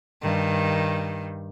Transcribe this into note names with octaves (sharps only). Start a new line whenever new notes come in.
G2 D#3